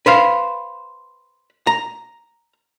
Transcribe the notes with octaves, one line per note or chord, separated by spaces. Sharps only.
B4 C5 F5
A#5